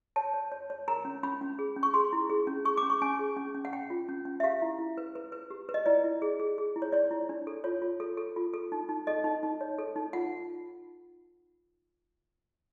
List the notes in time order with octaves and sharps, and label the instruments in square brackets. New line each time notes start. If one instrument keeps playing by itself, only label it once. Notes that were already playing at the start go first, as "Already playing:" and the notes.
[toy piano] C#5 A5
C#5
C#5
C#5
A#4 A#5
C#4
C#4 B5
C#4
G#4
C#4
C#6
G#4 C6
E4
G#4
C#4
G#4 C#6
D6
C#4
C#6
C#4 G#5
G#4
C#4
C#4
F#5
C#4 G5
F4
C#4
C#4
E5
G4 F5
E4
E4
B4
B4
B4
G4
B4
D#5
E4 D5
E4
G#4
G#4
G#4
E4
C#5
C#5 D5
E4
D4
A4
F4 C#5
F4
A4
A4
F4
A4
D#4
D#4
A4 D#5
D#4
D#4
C#5
A4
D#4
F4 F#5